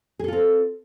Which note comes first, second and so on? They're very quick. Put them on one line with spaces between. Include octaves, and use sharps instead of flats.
G#4 A4 F4 C4